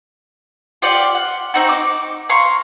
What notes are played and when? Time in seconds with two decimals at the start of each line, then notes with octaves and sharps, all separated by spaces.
0.82 F4 G4 D5 F#5
1.15 F#5
1.54 C4 D#4 F#4
1.69 D6
2.29 F5 A#5 C6 C#6